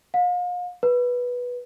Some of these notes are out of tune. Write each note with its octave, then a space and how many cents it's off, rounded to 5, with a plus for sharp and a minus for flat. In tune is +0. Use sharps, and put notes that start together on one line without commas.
F5 +40
B4 -10